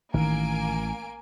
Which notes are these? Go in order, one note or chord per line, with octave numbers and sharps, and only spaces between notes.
A1 D#3 A#3 G#5 D7